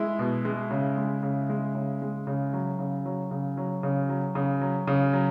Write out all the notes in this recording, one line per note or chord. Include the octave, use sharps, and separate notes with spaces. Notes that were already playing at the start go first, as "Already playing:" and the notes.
Already playing: G#3 E4
B2
G#3
C#3
G#3
C#3
G#3
C#3
G#3
C#3
F#3
C#3
F#3
C#3
F#3
C#3
F#3
C#3
F#3
C#3
F#3